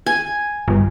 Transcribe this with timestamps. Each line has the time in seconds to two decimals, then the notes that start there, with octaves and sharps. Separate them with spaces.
0.06 G#5
0.68 G1